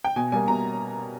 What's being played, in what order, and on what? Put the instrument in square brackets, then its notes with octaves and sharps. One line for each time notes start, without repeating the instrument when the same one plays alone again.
[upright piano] G5
B2 G#5
G3 A#3 G#5
B2 A#5